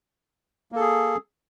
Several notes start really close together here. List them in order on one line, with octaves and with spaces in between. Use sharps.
A#3 A4 G#4